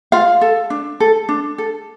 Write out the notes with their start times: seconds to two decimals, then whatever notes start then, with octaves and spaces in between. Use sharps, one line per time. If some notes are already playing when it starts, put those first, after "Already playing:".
0.12 F4 F5
0.41 A4
0.70 D4
1.00 A4
1.29 D4
1.58 A4